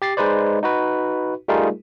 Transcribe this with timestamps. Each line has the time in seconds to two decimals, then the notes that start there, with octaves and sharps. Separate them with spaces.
0.02 G4 A6 C7
0.17 G#3 D#4 B4 C5 D5
0.63 D#4 F#4 B4
1.48 G3 A3 D#4 F4 G#4 A#4